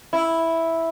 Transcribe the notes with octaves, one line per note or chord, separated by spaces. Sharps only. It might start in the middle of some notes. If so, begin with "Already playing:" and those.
E4